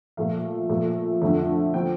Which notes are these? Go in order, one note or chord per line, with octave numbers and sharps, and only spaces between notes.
A#2 F3 A3 F5
A#2 F3 A3
F2 D3 F3 A3
F3 C4 G5